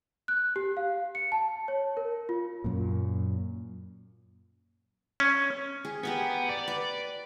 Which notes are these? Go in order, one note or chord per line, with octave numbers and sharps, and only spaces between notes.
F#6
G4
F5
C#7
A5
C#5
A#4
F4
F#2 A#2
C#4
G#4
B3 G4 A#4 G#5
D5
B4